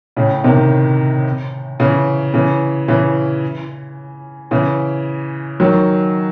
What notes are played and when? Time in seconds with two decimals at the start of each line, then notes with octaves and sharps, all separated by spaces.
0.16 A2 C#3
0.44 C3 D#3
1.80 C#3 E3
2.34 C#3 E3
2.88 C#3 E3
4.51 C#3 E3
5.60 D#3 F#3